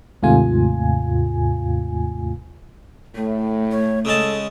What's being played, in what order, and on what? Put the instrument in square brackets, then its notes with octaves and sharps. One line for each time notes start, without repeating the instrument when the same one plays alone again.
[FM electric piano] D#2 G#2 C3 A3 F4 G#5
[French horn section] A2 [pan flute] A3
[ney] C#5
[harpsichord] C#3 G#3 A5 [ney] A4